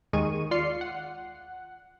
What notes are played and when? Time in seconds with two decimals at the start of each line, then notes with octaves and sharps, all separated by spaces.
0.13 D#2 D#3 G#3 G#4 C#6 D#7
0.51 F4 D5 C6 F6 C7 C#7
0.81 F#5